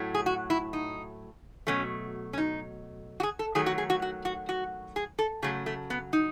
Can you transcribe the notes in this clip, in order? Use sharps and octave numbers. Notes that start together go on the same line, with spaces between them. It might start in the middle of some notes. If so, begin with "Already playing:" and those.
Already playing: A2 F#3 A3
G#4
F#4
E4
D#4
B2 F#3 A3 C#4
C#4
D#4
F#4
G#4
A4
D#3 F#3 A3 G#4
F#4
G#4
F#4
F#4
F#4
F#4
G#4
A4
C#3 F#3 A3 G#4
A3
B3
D#4